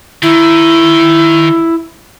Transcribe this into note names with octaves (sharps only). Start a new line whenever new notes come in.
D#3 E4